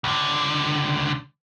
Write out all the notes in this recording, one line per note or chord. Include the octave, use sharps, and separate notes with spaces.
C#2 D3